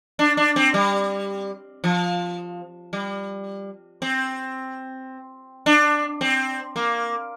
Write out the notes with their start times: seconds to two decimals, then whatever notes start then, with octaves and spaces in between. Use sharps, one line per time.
0.19 D4
0.37 D4
0.56 C4
0.74 G3
1.84 F3
2.93 G3
4.02 C4
5.66 D4
6.21 C4
6.76 A#3